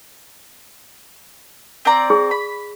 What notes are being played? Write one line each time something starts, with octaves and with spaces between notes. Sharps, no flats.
C4 D5 A#5
G#4
B5